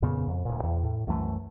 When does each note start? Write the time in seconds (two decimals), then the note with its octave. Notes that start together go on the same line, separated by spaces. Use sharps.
0.02 F2 A#2 C#3 B3
0.27 F2
0.45 D1 A#2
0.63 E2
0.84 A2
1.07 C2 F#2 E3 A3